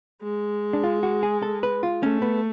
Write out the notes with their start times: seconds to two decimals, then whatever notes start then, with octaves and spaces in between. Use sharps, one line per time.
0.23 G#3
0.73 D4
0.84 F4
1.03 F#4
1.23 G#4
1.42 A4
1.63 B4
1.83 F4
2.03 A3 C#4
2.22 B3